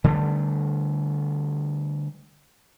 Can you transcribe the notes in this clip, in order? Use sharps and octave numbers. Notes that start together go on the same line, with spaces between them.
D3 G3 A3